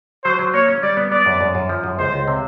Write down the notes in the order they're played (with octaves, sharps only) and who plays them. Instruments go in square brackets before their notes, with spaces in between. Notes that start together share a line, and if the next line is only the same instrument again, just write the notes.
[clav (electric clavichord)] F#3 [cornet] C5
[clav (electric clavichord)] F#3
[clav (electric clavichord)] A#3 [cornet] C#5
[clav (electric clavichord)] C#4
[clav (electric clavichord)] G3 [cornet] D5
[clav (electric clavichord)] B3
[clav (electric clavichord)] B3 [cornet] D5
[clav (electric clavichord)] F#2
F#2
F#2
F3
F#2
[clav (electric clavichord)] C#2 [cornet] C5
[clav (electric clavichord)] C#2
C3